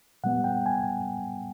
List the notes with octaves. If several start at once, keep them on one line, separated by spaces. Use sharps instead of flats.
A#2 G3 B3 F#5
G5
G#5